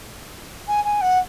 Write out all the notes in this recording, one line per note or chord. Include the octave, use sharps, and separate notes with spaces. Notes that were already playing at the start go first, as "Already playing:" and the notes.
G#5
G#5
F#5